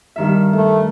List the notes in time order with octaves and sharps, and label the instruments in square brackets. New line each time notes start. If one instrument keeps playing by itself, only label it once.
[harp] G2 D#3 E5
[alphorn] A3